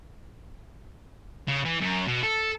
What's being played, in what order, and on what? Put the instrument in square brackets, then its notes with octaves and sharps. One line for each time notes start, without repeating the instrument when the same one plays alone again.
[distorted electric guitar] C#3
E3
F#2
B2
A4